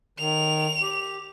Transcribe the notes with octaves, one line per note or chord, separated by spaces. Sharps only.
D#3 F7
G4